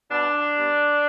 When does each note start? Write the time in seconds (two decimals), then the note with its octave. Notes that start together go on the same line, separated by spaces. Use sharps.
0.11 B2 D4
0.56 G3 B3